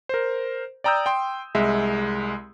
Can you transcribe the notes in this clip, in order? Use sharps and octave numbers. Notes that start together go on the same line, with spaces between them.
A#4 C5
D5 G5 A#5 D#6 E6 G6
G5 C6
C2 G#3 E5